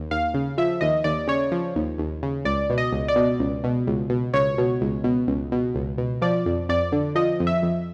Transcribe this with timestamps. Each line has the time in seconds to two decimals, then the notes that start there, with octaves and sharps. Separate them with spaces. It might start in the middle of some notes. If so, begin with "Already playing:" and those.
Already playing: D#2
0.11 D#2 F5
0.34 C#3
0.58 F3 E5
0.81 D#2 D#5
1.04 D#2 D5
1.28 C#3 C#5
1.52 F3
1.76 D#2
1.98 D#2
2.23 C#3
2.45 C#2 D5
2.70 B2
2.78 D#5
2.93 C#2
3.08 D5
3.16 B2
3.39 C#2
3.64 B2
3.87 C#2
4.10 B2
4.34 C#2 C#5
4.58 B2
4.81 C#2
5.04 B2
5.28 C#2
5.52 B2
5.75 C#2
5.98 B2
6.22 F3 D5
6.46 F2
6.69 F2 D5
6.92 D3
7.15 F3 D#5
7.40 F2
7.47 E5
7.62 F2